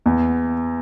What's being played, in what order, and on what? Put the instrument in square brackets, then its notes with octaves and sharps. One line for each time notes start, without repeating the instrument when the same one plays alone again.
[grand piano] E2